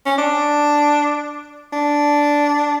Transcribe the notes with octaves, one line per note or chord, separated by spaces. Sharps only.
C#4
D4
D4